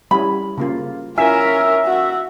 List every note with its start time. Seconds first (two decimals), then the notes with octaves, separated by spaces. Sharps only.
0.11 G3 C#4 E4 B5
0.58 C#3 A#3 F4
1.18 C#4 E4 F4 A#4 E5 G#5
1.85 F#4